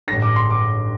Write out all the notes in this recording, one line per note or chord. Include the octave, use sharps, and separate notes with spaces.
A1 G2 D3 A#6
D6
C6
D6